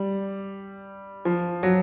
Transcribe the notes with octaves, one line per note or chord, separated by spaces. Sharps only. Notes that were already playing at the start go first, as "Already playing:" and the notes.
Already playing: G3
F3
F#3